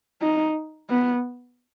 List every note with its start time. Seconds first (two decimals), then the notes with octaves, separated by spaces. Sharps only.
0.22 D#4
0.90 B3